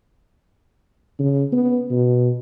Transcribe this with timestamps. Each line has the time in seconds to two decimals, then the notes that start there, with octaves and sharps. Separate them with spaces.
1.20 C#3
1.52 B3
1.91 B2